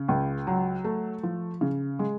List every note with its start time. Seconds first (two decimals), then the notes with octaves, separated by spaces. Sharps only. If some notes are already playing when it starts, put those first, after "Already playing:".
Already playing: C#3
0.08 C#2
0.47 F#3
0.84 A3
1.23 F3
1.61 C#3
1.99 G#3